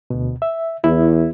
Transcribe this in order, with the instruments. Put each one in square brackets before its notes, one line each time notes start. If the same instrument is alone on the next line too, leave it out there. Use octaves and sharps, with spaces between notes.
[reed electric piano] D2 B2
E5
[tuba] E2 [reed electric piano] E4